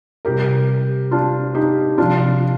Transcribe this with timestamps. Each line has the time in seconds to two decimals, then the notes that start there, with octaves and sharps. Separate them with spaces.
0.25 C3 G3 G4 A#4
1.11 D4 F4
1.55 D#4 G4
1.98 C3 F3 D4 F4